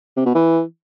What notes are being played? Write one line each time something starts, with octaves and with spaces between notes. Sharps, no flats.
C3
B2
E3